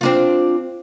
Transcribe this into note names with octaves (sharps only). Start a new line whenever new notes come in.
C4 D4 F4